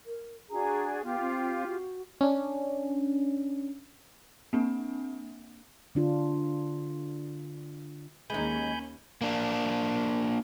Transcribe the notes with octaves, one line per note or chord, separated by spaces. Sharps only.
A#4
D4 F#4 G#4 A#5
B3 F4 G4 F5
C4
F#4
C#4 D4
A#3 C4 D4
D3 D4 F4
D#2 G#3 C#4 D#4 G#5 B5 G6
A#3 D4